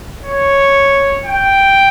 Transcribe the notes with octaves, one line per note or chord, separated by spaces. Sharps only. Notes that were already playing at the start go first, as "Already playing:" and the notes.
C#5
G5